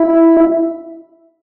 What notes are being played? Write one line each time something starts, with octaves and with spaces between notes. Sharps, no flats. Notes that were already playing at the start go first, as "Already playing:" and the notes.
Already playing: E4